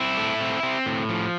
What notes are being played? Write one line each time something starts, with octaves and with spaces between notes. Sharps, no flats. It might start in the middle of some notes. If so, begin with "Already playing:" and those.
Already playing: C4 E4
A3
C4
C4
A2
F3